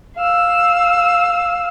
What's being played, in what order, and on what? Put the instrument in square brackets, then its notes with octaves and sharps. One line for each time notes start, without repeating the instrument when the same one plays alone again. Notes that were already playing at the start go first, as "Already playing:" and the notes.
[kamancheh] F5 E6